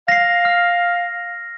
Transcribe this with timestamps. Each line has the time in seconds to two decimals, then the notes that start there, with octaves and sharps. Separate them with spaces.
0.08 F5 A#6 C7
0.45 F6